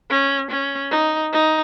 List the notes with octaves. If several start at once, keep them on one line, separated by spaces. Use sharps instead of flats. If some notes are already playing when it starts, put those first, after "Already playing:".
C#4
C#4
D#4
D#4